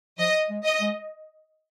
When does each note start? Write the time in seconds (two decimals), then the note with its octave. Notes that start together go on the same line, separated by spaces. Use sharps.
0.19 F3 D#5
0.50 G#3
0.65 D#5
0.81 G#3